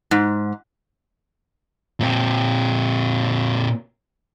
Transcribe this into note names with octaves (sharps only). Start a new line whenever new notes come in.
G#2
A#2 C4